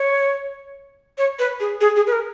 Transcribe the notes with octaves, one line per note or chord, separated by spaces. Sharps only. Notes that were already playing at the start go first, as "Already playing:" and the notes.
Already playing: C#5
C#5
B4
G#4
G#4
G#4
B4
A#4